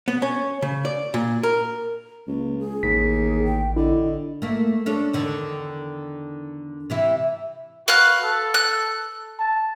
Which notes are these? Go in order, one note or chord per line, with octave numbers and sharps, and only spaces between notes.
B3
C#4
C#3
D5
A#2
A#4
C#2 A#3
G#4
A1 D#2 B6
G5
D3 E4 D#5
A3 A#3
C#4 D4 A4
E2 D3 D#3
C3 E3 E4
F#4 B4 F5 F#6
A4
F#6
A5